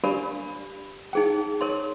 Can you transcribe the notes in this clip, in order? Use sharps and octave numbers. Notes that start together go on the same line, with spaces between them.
D4 G4 A#4 D5 B5
D#4 G#4 G5
A#4 C#5 C6